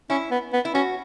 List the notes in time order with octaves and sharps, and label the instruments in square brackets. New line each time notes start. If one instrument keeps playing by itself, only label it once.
[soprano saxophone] C#4 [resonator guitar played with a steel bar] E4
[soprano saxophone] B3
B3
[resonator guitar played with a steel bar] E4
[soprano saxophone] C#4 [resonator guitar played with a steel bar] F#4